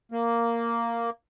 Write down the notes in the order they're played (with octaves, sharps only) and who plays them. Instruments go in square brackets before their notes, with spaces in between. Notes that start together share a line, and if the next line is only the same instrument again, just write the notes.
[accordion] A#3